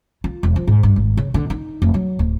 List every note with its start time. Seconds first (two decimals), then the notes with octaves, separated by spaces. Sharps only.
0.24 F4
0.43 E1
0.56 F3
0.67 G#2
0.83 G2
0.96 G#1
1.17 C#3
1.34 D3
1.50 D#4
1.82 F1
1.94 F#3
2.19 D1